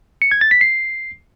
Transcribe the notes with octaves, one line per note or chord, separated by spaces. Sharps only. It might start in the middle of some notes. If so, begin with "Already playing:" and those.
C#7
G#6
A6
B6
C7